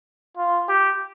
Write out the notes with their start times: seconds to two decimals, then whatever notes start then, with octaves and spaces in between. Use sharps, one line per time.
0.37 F4
0.69 G4